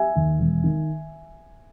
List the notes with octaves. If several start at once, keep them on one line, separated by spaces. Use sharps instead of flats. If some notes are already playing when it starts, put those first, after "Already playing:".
Already playing: E5 G#5
D#2
E1
D#3